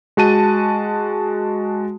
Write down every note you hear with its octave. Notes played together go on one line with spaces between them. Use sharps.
G#3 F#4 A5 D#7